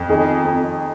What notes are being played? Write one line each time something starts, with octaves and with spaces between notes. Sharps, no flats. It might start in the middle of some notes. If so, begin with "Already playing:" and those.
Already playing: F2
D#3 G#4
F2